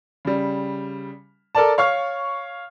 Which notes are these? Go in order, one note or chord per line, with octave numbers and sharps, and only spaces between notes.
C#3 G3
A4 A#4 D5 A5
C#5 F5 C#6 F6